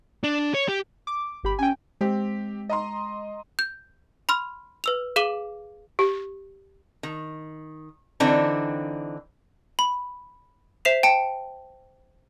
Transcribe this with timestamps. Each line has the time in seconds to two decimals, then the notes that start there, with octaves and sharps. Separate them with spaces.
0.24 D4
0.54 C#5
0.68 G4
1.07 D6
1.44 G1 G4 B5
1.59 C#4 G5 G#5
2.01 G#3 C4 G4
2.69 D#5 A#5 C6
3.59 G6
4.29 B5 C6 F6
4.84 B4 E6 F7
5.16 G#4 F5 D6 D#7 F#7 G7
5.99 G4
7.03 D#3
8.20 D3 E3 C4 D4 D#4
9.79 B5
10.85 C5 E5 B6 C7 E7 F7
11.03 G5 A5 C#7